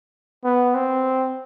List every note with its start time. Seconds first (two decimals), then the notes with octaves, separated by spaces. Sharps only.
0.44 B3
0.75 C4